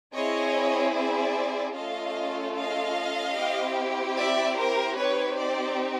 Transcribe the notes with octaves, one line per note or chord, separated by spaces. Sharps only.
C4 E4 G#4 C#5 D#5
D5 E5
A3 C#4 F4 A4 D#5 F5
D#5 F5
C4 E4 G4
D5 E5
A#4 C5
C4 D#4 G4 B4 C#5
C5 D5